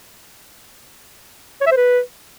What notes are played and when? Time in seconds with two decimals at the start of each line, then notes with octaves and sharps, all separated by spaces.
1.61 C#5
1.66 E5
1.72 C5
1.77 B4